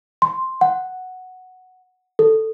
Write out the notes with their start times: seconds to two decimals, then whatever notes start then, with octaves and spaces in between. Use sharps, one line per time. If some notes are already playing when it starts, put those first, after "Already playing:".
0.22 C6
0.61 F#5
2.19 A4